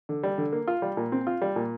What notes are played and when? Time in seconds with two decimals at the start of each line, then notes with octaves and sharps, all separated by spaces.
0.09 D3
0.23 G3
0.38 D3
0.53 A#3
0.68 F4
0.82 G3
0.97 A#2
1.12 C4
1.27 F4
1.42 G3
1.56 A#2